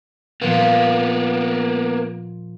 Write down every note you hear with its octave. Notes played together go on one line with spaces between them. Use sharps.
A#2 F3 A#3 B3